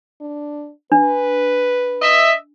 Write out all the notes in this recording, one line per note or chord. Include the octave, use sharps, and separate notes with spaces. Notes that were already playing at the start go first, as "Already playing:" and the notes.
D4
D4 B4
D#5 E5